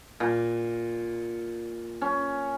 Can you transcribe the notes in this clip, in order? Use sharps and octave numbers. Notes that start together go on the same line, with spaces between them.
A#2
C#4